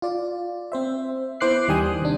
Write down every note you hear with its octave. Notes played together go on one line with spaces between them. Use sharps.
F4 D5
C4 C5 E5
B3 E4 C5 D6 F#6 C7
D#2 D#3 G3 G5 G#5 D#6
C3 D4